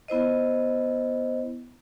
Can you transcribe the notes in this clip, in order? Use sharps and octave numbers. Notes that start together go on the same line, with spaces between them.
B3 E4 C5 D#5